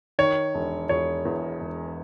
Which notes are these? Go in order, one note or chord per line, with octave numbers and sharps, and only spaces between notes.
D#3 C#5
E1
E1 C#5
E2
E1